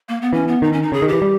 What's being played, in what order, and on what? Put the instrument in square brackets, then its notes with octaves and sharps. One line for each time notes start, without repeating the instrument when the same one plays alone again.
[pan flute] A#3
B3
[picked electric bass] E3 [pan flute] C#4
[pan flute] B3
[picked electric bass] D#3 [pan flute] D#4
[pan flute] C#4
D#4
[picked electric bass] C#3 [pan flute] G#4
[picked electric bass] D#3
[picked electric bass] E3 [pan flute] G4
[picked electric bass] G3